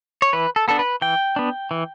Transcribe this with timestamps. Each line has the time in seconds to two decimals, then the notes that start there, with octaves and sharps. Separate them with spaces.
0.22 C#5
0.33 E3 B4
0.56 A4
0.68 B3 D4 A4
0.79 B4
1.02 E3 G5
1.36 B3 D4
1.71 E3